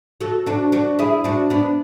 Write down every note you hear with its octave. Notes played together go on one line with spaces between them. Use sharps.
F#4 A4
D4 F#4
D4 F#4
E4 G#4
D4 F#4
B3 D4